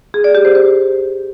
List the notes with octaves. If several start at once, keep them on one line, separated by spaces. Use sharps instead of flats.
G#4
D5
G4
C5
C5